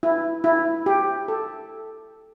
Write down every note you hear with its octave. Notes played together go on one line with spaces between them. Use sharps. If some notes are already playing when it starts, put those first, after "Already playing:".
E4
E4
G4
A4